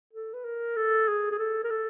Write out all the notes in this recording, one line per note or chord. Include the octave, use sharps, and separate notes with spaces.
A4
B4
A#4
A4
G#4
G#4
A4
A#4
A4